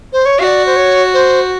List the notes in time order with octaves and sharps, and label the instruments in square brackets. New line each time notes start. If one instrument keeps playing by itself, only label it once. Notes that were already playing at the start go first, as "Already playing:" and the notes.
[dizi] C5
C#5
[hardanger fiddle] F#4 [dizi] F5
[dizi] D5
C5
C#5
C5